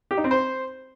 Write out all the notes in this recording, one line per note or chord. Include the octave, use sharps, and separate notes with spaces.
G4
D#4
C4
C5